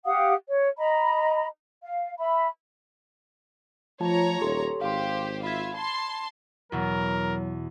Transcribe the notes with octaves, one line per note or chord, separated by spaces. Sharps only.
G4 F5 F#5 D#6
C#5
D#5 A#5 B5
F5
E5 B5
F3 A3 F4 C#5 A5 A#5
D#1 G4 A4 C6
G#1 G4 C5 F5 C6
F4 E5 B5 G#6
A5 C6
E2 B2 F#3 A#4